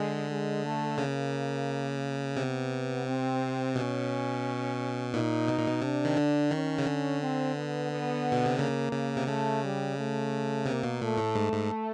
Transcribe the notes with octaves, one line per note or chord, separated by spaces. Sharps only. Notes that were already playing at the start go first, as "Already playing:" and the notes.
Already playing: D3 G#3
G#3
A3
C#3 A#3
C3 B3
C4
B2 C#4
A#2 D#4
B2
A#2
B2
C3 D4
D#3
D3
D#3 C#4
C#3
D3
C4
B3
B3
B2
C3
C#3 A#3
C#3
C3
C#3 A3
G3
A3
C3 A#3
B2
A#2 A3
A2
G#2
G#2